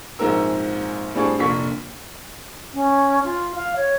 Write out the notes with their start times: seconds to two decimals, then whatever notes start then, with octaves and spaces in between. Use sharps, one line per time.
0.19 A#1 G#2 G#3 C4 A#4 E6
1.15 A2 G3 C4 D4 G#4 C#6
1.39 F1 A#2 A#3 D4 C#6 B6
2.74 C#4
3.24 F4
3.55 F5
3.76 C#5